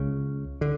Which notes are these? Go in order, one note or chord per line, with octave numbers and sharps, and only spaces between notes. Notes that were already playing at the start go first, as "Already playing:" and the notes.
Already playing: C#2 C#3
D3